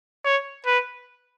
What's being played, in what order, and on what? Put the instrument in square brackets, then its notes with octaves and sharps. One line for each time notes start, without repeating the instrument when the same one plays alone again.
[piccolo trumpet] C#5
B4